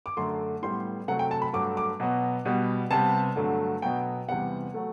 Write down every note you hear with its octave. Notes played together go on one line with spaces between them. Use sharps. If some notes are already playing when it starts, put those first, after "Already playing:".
D6
F#2 D3 A3 C6
A2 G3 B3 C6
C3 F#3 A3 F#5
G5
A5
B5
G2 F#3 A3 D6
D6
B2 F#3 B3
B2 G3 B3
C3 G3 B3 A5
G2 D3 F#3 A3
B2 F#3 B3 G5
E2 C3 G3 B3 F#5
F#3 A3